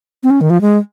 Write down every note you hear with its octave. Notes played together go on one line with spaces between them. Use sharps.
C4
C#4
D#3
F3
G#3